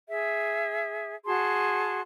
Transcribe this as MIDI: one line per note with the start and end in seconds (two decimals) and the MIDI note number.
0.08 1.15 68
0.08 1.15 76
1.25 2.01 66
1.25 2.01 68
1.25 2.01 81
1.25 2.01 84